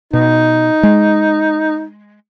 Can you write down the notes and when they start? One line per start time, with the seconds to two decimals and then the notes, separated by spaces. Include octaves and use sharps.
0.13 B2 D#4
0.83 G#3